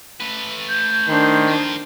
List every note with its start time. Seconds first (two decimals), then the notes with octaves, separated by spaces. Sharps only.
0.20 A3 B4
0.69 G6
1.08 D#3 D4 C5
1.47 C4 F4